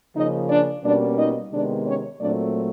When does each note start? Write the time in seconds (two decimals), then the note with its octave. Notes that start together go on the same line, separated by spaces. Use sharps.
0.15 C#3 F3 A#3 C#4 D#4 D#5
0.50 D4 D5
0.84 B2 G3 A#3 C#4 D4 D5
1.18 D#4 D#5
1.51 C3 D#3 G#3 B3 D4 D5
1.86 C#4 C#5
2.20 A#2 F#3 A3 C4 D4 D5